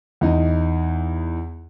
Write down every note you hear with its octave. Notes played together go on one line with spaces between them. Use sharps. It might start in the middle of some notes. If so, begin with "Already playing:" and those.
E2 D#4